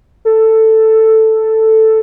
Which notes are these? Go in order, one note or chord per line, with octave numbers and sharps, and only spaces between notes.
A4